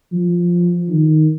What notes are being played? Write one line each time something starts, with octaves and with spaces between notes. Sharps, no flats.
F3
D#3